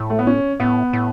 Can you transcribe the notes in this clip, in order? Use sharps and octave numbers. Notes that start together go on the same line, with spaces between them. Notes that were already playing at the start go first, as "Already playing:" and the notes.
Already playing: A2
A3
B3
C#4
A2 B3
A2